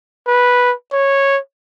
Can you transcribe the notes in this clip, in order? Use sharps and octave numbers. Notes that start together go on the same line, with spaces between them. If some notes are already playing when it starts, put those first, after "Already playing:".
B4
C#5